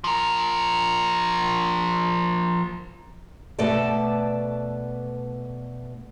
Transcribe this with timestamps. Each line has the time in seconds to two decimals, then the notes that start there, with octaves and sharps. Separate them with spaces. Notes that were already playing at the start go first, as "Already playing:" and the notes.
0.04 F3 A#4
3.58 B2 A3 A4 B4 D5 A5